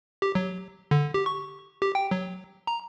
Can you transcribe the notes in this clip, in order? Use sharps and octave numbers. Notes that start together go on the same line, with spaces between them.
G4
F#3
D3
G4
C#6
G4
G5
F#3
A#5